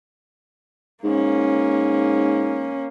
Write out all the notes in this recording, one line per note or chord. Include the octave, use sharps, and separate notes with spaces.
G#2 A#3 C#4